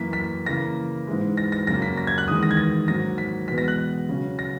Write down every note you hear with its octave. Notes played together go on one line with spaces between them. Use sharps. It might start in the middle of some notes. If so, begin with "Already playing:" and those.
Already playing: F#2 E3 A#3 B6
B6
C#3 E3 A#3 A#6
G#2 E3 G#3
A#6
A#6
F#2 C#3 F#3 A#3 A#6
B6
A#6
G#6
F#6
E2 D#3 G#3 D#6
A#6
G#6
A#6
G#2 F#3 A#3 A#6
B6
E2 B2 G#3 B3 B6
A#6
F#6
C#3 F#3 C#4
A#6